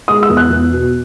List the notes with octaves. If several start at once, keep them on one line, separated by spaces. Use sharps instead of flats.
G#3 D#6
E6
E2
F#6
E2
B2